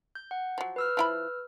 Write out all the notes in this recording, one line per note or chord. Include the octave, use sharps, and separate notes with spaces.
G6
F#5
F3 F#3
B4 E6 F6
F3 E4 B5